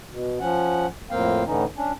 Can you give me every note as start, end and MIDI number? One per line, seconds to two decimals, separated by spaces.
0.10 0.38 47
0.40 0.86 53
0.40 0.86 61
0.40 0.86 78
1.11 1.44 41
1.11 1.44 45
1.11 1.44 58
1.11 1.44 60
1.11 1.44 77
1.11 1.44 79
1.46 1.65 45
1.46 1.65 50
1.46 1.65 52
1.46 1.65 61
1.46 1.65 63
1.76 1.92 61
1.76 1.92 62